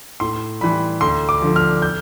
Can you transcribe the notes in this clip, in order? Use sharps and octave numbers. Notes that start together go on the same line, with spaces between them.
A2 C6
E3 G3 B5
D2 C6
D6
D3 F3
F6
G6